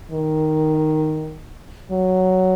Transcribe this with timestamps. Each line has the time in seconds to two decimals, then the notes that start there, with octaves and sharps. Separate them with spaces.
0.11 D#3
1.91 F#3